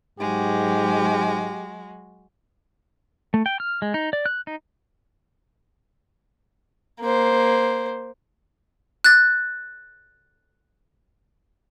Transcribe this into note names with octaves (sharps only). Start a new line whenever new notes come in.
G#2 F#3 G#3 F#4 G4
A3
G5
F6
G#3
D#4
D5
F#6
D#4
A#3 C5
F#6 A6